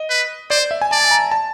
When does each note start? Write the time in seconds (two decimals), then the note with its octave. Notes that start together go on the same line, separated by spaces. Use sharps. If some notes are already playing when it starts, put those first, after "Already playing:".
Already playing: D#5
0.10 B4
0.50 C5 D5
0.71 E5
0.81 G#5
0.91 D5 A5
1.11 A#5
1.31 A5